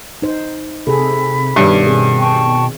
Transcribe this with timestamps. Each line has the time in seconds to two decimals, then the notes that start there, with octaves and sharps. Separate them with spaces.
0.22 D#4 C5
0.87 C3 G#4 A4 B5
1.56 G2 B2 D#3 C#5 E5
1.86 C4 G#4
2.19 G5 A5 C#6